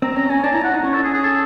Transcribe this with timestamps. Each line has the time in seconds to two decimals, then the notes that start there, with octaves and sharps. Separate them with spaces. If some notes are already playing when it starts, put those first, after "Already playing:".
0.02 C4 A#5
0.16 C#4 A#5
0.30 C#4 G#5
0.43 D4 A5
0.54 E4 A#5
0.64 E4 F#5
0.74 D#4
0.84 C#4 C#5
0.94 A4
1.04 G#4
1.14 G#4
1.24 A4